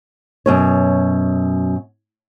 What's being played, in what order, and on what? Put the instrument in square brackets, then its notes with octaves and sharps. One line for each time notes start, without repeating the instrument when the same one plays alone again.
[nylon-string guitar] F#2 B2 C#5